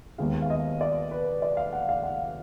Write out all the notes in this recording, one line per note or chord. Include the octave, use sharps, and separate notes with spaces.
D#2 D#3 G#3 B3 F5
F5
D#5
D5
B4
D5
F5
F#5
F5
F#5